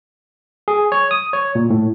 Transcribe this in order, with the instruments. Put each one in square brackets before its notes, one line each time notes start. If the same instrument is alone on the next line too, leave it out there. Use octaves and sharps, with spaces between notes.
[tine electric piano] G#4
C#5
D#6
C#5
A#2
A2